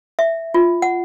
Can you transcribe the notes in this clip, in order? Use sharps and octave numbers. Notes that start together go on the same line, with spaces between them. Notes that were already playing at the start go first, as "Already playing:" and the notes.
E5
F4
F#5